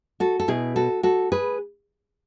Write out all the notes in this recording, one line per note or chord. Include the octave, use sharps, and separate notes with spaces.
F#4 A4
A4
B2 E4 G#4
F#4 A4
F#4 A4
G#4 B4